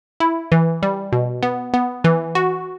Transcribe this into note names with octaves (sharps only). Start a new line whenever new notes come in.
E4
E3
G3
B2
B3
B3
E3
F#4